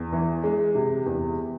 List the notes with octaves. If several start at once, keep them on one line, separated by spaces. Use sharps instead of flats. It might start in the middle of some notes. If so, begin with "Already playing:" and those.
Already playing: E2
E3
G#3
C3
E2